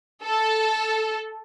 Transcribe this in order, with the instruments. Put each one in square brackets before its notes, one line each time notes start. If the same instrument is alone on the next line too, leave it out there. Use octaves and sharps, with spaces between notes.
[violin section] A4